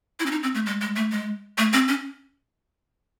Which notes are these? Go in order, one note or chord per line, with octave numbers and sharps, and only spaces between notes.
E4
C#4
D#4
C4
A3
G#3
G#3
A3
G#3
A3
C4
C#4